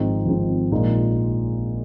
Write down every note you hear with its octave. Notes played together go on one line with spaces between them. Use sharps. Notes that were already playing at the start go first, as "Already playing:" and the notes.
Already playing: G#1 G#2 F3 C4 D#4
G#1 G#2 F3 C4 D#4
A#1 A#2 G#3 D#4